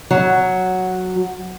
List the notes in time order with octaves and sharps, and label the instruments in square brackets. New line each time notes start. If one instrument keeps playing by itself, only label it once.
[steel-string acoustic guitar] F#3